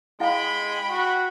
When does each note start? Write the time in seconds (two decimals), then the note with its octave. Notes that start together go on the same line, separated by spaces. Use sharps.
0.20 G#3 E4 F5 G5 B5
0.90 F#4